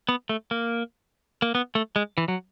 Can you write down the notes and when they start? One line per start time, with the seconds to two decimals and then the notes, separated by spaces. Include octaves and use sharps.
0.09 B3
0.29 A3
0.51 A#3
1.42 A#3
1.55 B3
1.75 A3
1.96 G#3
2.18 E3
2.28 F#3